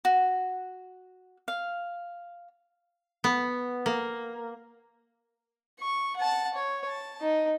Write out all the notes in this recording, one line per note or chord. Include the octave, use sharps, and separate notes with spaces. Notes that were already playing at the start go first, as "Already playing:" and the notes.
F#4
F5
B3
A#3
C#6
F#5 A5
C#5
A5
D#4